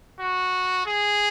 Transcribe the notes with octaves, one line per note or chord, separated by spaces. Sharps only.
F#4
G#4